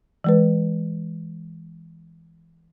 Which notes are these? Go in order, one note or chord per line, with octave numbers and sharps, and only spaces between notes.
E3 G#3 B4